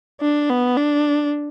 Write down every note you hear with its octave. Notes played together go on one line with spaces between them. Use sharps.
D4
B3
D4